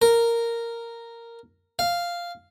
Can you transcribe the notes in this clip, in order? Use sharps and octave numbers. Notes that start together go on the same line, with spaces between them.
A#4
F5